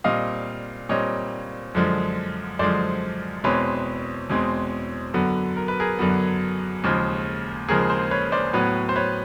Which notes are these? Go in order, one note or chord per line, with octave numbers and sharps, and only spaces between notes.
A#2 G3 C4 D#5 F5
A#2 G3 C4 C#5 D#5
F#2 D3 F3 G#3
F#2 D3 F3 G#3 C5 D5
E2 B2 G#3 C4 B4 C#5
E2 B2 G#3 C4
F#2 D3 F#3 B3
A#4
B4
G#4 A#4
F#2 D3 F#3 B3
D#2 C#3 F3 G#3
D#2 C#3 F3 G#3 G#4 A#4
A#4 C5
B4 C#5
C5 D5
A2 F#3 B3 B4 C#5
C5
B4 C#5